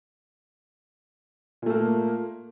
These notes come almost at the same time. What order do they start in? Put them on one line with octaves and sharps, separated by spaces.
A#2 A3 A#3